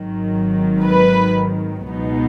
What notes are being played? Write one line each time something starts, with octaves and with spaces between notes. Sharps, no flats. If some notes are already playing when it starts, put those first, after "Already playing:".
Already playing: G#1 G#2 D#3 F#3
B4
C#2 B2 F#3 B3 D#4